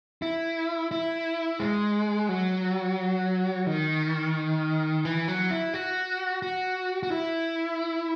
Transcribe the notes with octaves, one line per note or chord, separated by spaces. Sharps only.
E4
E4
G#3
F#3
D#3
E3
F#3
E4
F#4
F#4
F#4
E4